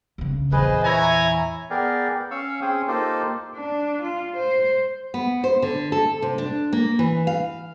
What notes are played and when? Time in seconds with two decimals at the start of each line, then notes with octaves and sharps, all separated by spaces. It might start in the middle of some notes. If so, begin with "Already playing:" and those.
0.18 D2 C#3
0.52 E2 A#2 G#4 B4 C5 D#5
0.84 E4 C#5 E5 G#5 A#5
1.70 B3 G#4 A#4 D5 G5
2.31 C#4 F5 C#6 E6
2.62 C4 C#4 G#4 G5 D#6
2.88 A#3 D#4 F4 G4 A4 C5
3.56 D4
4.02 F4
4.36 C5
5.14 B3
5.44 C5
5.62 D3
5.92 A4
6.22 C3
6.38 D4
6.73 A#3
6.99 E3
7.27 F5